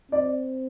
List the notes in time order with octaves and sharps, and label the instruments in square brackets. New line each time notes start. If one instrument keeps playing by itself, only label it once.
[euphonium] C4 [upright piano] D5